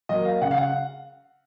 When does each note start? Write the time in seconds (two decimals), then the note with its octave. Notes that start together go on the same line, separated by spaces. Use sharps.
0.09 F#3 A#3 D#5
0.25 F5
0.41 C#3 F#5
0.51 F5
0.57 F#5